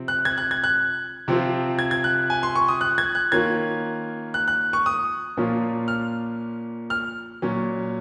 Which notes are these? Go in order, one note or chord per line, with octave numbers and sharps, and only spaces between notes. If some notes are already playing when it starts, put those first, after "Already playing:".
Already playing: C3 F3 C4
F#6
G#6
F#6
G#6
F#6
C3 F3 C4 F4
G#6
G#6
F#6
G#5
C6
C#6
D#6
F#6
G#6
F#6
D#3 A#3 C#4 F4 G#6
F#6
F#6
C#6
D#6
A#2 F3 A#3 C#4 F4
F6
F6
A#2 F#3 C#4